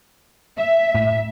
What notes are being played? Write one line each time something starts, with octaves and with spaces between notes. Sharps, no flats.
E5
A2